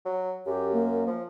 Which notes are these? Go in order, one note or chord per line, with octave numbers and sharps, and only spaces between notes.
F#3
F#2 G4
A#3
F3